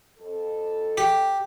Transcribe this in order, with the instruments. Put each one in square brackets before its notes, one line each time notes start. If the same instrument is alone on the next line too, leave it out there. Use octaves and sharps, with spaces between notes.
[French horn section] F2 A4
[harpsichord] G4